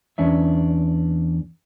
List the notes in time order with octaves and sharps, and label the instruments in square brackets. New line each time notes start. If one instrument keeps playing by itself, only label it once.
[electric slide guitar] E2 C#4 D4 E5